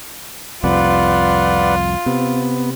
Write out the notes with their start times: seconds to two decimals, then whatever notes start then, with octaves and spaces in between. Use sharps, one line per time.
0.64 C2 F2 F4 B4 D5 F#5
2.06 C3 B3